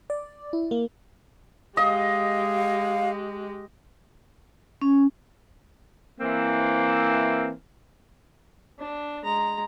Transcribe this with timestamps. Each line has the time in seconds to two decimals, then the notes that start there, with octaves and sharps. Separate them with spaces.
0.10 D5
0.53 E4
0.71 A#3
1.77 G#3 G4 D#5 F5
4.81 C#4
6.20 E3 A#3 C4
8.79 D4
9.24 G#3 A#5